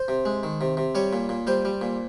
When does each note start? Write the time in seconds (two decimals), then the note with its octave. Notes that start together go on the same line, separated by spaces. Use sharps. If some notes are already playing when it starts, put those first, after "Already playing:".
Already playing: C5
0.08 C3
0.25 G#3
0.43 D#3
0.61 C3
0.77 C3
0.95 G3 C#5
1.13 A#2
1.29 A#2
1.47 G3 C5
1.65 G3
1.82 A#2